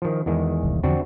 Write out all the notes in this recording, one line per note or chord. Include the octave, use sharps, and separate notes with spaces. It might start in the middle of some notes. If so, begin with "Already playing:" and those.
D#3 F3
E2 D#3 G#3
D1 C2
E2 D3 F3 C4 D4 F#4